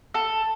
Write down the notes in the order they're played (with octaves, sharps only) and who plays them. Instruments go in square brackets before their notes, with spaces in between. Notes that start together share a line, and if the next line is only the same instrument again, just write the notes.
[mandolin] A4